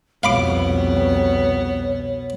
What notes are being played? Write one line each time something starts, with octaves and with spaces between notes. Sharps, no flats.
C2 F2 B2 B3 C#5 F5 B5 D6